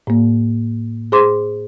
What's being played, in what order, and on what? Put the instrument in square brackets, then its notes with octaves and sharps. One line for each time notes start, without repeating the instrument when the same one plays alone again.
[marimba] A2 A#3
G#4 C5 C6 D6